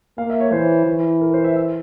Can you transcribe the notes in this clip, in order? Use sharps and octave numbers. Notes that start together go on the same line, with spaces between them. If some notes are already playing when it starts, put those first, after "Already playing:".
A#3 F5
E5
C#5
E3 C5
E3
A#4
C5
E5
E5